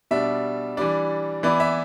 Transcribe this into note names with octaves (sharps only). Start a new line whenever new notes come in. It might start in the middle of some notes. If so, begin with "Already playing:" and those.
B2 G3 D4 E5
E3 G3 D4 D5
E3 B3 E4 D5
E5